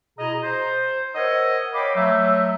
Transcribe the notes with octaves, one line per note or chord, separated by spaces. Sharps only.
B2 E4 G#4 D#5 A#5
C5
A#4 C5 C#5 D#5 E5 F#5
C#5 F5 G5 B5 D6
F#3 A3 E5